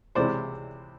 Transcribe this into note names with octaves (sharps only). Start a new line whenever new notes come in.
C#2 C3 E3 G#3 C5 D5